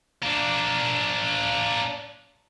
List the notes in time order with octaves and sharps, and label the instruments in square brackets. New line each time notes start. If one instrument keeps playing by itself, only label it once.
[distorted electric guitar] A#3 D4